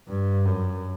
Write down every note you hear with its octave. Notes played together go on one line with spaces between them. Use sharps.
G2
F#2